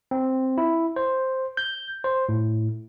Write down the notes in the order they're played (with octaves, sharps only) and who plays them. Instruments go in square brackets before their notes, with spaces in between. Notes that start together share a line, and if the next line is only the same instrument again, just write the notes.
[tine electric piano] C4
E4
C5
G6
C5
A2